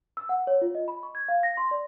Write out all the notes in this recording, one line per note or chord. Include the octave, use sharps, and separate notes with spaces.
E6
F#5
C#5
F4
D#5
B5
C#6
G#6
F5
A#6
C6
D5